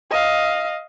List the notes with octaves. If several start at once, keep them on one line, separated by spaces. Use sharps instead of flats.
D#5 F5